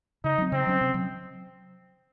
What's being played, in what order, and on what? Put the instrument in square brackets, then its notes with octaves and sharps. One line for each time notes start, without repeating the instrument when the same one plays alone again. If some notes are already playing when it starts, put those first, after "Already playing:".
[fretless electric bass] C#3 [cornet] D#4
[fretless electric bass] F#3 C4
[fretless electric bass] C#3 [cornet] C4
[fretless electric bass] F#3 C#4
C3
F#3